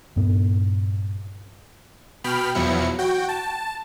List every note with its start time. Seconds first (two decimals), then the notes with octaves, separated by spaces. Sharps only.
0.16 G2 A#2 B3
2.24 B2 G5 B5 F6
2.55 E2 B2 F3 F#3 E4 C#7
2.99 F#4 G5
3.29 A5